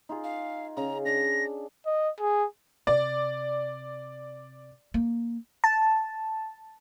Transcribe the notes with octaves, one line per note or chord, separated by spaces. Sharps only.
D#4 F4 G#4
F5
C#3 A#5
D4 A#6
D#5
G#4
C3 D5
A#3
A5